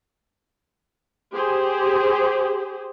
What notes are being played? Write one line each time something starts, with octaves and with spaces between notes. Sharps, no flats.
G4 G#4 C5